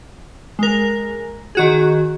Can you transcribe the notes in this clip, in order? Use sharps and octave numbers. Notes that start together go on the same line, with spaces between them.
G#3 A#4
D#3 F#4 G#4